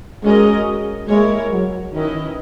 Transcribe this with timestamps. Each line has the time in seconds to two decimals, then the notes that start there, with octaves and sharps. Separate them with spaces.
0.24 G#3 C#4 F#4 A#4 D#5
1.08 G#3 A#3 E4 A#4 C#5
1.51 F#3
1.93 D#3 C#4 E4 B4 D#5